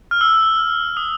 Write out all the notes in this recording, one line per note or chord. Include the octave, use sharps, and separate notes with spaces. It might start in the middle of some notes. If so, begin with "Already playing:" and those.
F6
E6
D#6